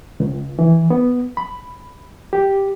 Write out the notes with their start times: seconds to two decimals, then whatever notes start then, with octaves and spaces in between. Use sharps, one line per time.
0.20 C#2
0.59 E3
0.90 B3
1.37 B5
2.33 G4